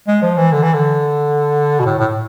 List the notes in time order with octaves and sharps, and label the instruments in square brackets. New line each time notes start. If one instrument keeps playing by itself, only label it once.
[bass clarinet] G#3
F3
E3
D3
E3
D3
B2
A2
A2